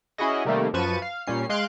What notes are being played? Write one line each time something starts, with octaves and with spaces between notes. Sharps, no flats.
C#4 E4 F#4 G#4 D#5
C3 D#3 G3 A3 A#3
F#2 F3 B4 A5 C#6 D#7
F5
A#2 G3 C#4 C7
G#3 F5 C6 F#6 D7